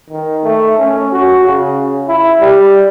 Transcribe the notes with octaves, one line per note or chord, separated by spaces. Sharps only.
D#3
A3
C#4
F#4
C#3
E4
G3